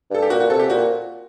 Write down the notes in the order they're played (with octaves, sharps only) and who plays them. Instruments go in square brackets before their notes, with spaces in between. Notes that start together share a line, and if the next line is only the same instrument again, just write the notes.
[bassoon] G2 [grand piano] A4
[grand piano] G4
[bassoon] A#2 [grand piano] F#4
[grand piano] F#4
[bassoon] C3 [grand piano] A4
[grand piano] G4
[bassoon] A#2 [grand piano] F#4